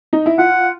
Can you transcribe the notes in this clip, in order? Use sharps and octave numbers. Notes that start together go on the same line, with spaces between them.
D#4
E4
F4 F#5